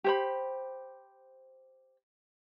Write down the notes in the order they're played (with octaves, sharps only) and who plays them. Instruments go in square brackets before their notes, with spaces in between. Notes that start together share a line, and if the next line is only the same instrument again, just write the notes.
[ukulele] G4 C5 B5